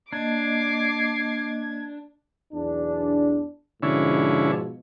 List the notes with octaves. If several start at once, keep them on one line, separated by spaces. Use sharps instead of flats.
A#3 D4 D#5 D6 G#6 C7
B1 E2 D4
G#2 B2 D3 F3 C#4 E4